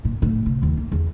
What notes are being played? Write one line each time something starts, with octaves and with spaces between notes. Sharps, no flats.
A#2
A2
C3
D#2
A#3
E2